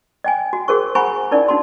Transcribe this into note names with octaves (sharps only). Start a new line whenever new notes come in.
D#5 G5 G#5
F#4
F#4 G#4 A#4 C5 C#6
C5 F#5 G#5 A#5 B5 C#6
C#4 D#4 E4 A#4 D5
D4 D#4 F#4 A5 C6